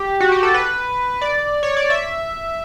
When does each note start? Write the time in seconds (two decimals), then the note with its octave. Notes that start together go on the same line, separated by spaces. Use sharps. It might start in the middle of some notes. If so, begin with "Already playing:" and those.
Already playing: G4
0.20 F#4
0.32 G4
0.43 A4
0.54 B4
1.21 D5
1.63 C#5
1.77 D5
1.90 E5